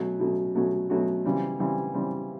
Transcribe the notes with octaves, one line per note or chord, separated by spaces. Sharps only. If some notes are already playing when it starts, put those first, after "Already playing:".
Already playing: B2 F#3 A3 C#4 F#4
B2 F#3 A3 C#4 F#4
B2 F#3 A3 C#4 F#4
B2 F#3 A3 C#4 F#4
C#3 E3 G3 C4
C#3 E3 G3 C4
C#3 E3 G3 C4